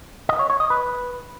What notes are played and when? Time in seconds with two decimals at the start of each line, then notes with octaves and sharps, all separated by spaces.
0.29 D#5
0.39 C#5
0.50 C#5
0.60 D#5
0.70 B4